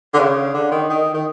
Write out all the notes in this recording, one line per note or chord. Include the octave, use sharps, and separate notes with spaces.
D3
C#3
D3
D#3
D#3
D#3